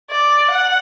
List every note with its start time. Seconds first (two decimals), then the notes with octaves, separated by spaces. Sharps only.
0.11 D5
0.50 F#5